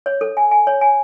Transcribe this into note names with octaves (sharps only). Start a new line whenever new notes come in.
C#5
A4
G#5
G#5
C#5
G#5